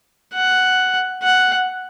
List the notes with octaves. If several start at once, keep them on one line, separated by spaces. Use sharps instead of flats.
F#5
F#5